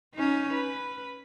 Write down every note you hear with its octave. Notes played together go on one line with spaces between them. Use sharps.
C#4 D#4
B4